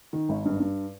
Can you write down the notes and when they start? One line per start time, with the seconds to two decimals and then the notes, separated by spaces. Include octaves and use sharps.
0.13 D#3
0.29 G#1
0.45 G2
0.60 G2